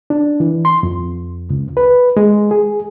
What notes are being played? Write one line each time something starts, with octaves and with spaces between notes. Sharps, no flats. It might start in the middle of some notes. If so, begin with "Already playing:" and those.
D4
E3
C6
F2
C#2
B4
G#3
G#4